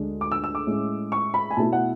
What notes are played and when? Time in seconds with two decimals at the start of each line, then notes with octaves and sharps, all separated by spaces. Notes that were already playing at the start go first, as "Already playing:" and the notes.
Already playing: D2 D3 G#3 D4
0.21 D6
0.32 E6
0.44 E6
0.55 D6
0.67 A2 G#3 C#4
1.12 C#6
1.34 B5
1.51 G#5
1.57 B2 A3 E4 A5
1.73 F#5